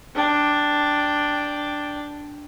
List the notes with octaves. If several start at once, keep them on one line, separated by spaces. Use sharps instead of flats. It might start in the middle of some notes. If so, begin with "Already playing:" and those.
D4 G5